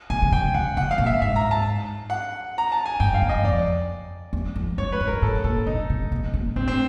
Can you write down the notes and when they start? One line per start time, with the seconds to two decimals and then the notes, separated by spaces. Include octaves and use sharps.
0.10 B2 G#5
0.22 C#3
0.32 C3 G5
0.54 C#3 F#5
0.77 C3 F#5
0.91 F5
0.98 A#2
1.06 E5
1.21 G#2 E5
1.36 A#5
1.51 A5
2.10 F#5
2.58 A#5
2.72 A5
2.86 G#5
3.00 G2 G5
3.14 F5
3.22 G2
3.29 D#5
3.43 F2 D5
4.33 E2
4.56 F2
4.78 G2 C#5
4.92 B4
5.00 G#2
5.07 A#4
5.22 A2 A4
5.44 A#2 A4
5.67 B2 D#4
5.90 C3
6.12 B2
6.34 A#2
6.56 A2 C4
6.68 C4